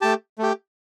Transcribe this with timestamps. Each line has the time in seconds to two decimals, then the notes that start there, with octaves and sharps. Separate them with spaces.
0.01 A3 G4 A5
0.38 A3 G4